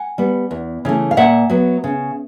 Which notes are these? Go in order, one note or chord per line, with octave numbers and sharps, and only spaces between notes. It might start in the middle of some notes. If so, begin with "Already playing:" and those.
Already playing: F#5 G#5
G3 B3
E2
C#3 E3 A3
F5
A#2 E5 F#5
F#3 B3
C#3